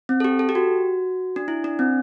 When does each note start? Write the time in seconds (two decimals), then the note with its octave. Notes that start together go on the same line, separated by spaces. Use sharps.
0.09 C4
0.20 A4
0.24 G4
0.39 A4
0.49 G4
0.55 F#4
1.36 D4
1.48 E4
1.64 D4
1.79 C4